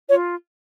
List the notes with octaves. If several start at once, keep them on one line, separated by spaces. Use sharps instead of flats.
F4 C#5